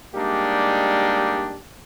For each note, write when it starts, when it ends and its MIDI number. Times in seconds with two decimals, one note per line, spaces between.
0.15 1.58 55
0.15 1.58 56
0.15 1.58 58
0.15 1.58 62
0.15 1.58 63
0.15 1.58 67